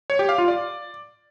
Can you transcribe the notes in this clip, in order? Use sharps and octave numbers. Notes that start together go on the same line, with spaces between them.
C#5
G4
F5
F4
D5